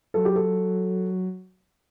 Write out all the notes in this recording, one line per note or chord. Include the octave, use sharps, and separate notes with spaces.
F#3 A4
G4
A4